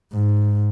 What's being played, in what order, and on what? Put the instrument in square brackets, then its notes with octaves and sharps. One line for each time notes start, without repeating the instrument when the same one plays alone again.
[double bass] G#2